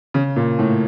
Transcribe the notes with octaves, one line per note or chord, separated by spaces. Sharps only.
C#3
A#2
A2